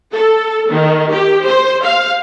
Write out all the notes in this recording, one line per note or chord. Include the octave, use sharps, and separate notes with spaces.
A4
D#3
G4
C5
F5